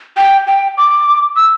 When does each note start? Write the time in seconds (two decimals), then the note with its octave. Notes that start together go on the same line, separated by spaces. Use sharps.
0.17 G5
0.47 G5
0.78 D6
1.36 E6